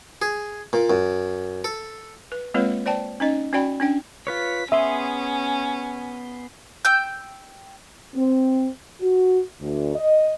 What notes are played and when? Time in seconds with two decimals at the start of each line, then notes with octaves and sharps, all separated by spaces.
0.22 G#4
0.73 A#2
0.90 F#2
1.64 A4
2.32 B4
2.54 G#3 A#3 C4 F4 B4 C#5
2.86 C5 D5 G5 A5
3.20 C#4 D#4 D#5
3.53 C#4 F#4 D5 G5 B5
3.80 C#4 D4 G5
4.27 F4 B4 C#5 B6
4.72 B3 C#4 G#4 E5 C6
6.85 G5 E6 G6
8.14 C4
9.00 F#4
9.59 D2
9.95 D#5